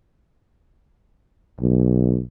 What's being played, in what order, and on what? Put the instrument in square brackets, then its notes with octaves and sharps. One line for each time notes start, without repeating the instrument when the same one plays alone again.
[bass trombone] B1